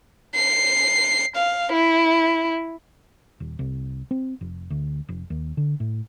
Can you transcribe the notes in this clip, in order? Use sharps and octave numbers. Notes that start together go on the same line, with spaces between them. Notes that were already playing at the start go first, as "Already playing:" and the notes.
C7
F5
E4
D#1
C2
C4
F1
D2
F1
D#2
D3
A2